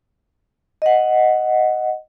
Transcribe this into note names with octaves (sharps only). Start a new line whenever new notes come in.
D#5 F#5